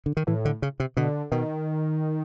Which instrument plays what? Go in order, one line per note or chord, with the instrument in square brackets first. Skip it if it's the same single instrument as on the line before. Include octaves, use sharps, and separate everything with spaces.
[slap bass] D3
D#3
[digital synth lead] A2 [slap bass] E3
[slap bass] D3
C#3
C3
[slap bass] B2 [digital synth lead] D3
[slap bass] B2 [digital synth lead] D#3